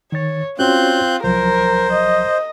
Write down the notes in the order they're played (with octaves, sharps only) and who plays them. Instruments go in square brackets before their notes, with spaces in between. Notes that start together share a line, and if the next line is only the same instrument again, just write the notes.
[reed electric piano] D#3 A6 [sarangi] C#5
[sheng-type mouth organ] C4 F#6 G6 [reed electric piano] C#4 F#4 C#5 [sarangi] F4
[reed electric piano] C2 F3 F#3 [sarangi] A#4 [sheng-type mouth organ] C5
[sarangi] D#5